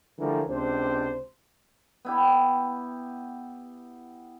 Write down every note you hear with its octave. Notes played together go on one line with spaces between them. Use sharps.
D3 E3 F3 G3 A3 A#4
C#2 C3 D4 C5
B3 E4 G4